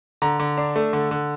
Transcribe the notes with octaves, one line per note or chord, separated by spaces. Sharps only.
D3 A#5
D3
D4
A3
D3
D3